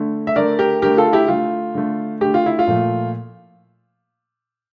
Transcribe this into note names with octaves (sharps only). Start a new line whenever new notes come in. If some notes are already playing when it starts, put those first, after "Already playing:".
Already playing: D3 A3
E5
D3 A3 A#4 D5
G4 A#4
D3 A3 G4 A#4
F4 A4
E4 G4
D3 A3 F4
D3 A3
D3 A3 G4
F4
E4
F4
A#2 F3 A3